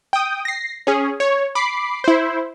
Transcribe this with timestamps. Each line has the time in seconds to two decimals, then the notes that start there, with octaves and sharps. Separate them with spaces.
0.13 G5 D#6
0.45 A#6 C7
0.87 C#4 G#4
1.20 C#5
1.55 B5 D6 C7
2.04 E4 C5